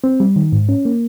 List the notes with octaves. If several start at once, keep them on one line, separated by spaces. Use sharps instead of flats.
C4
G3
D#3
G#2
C#4
A#3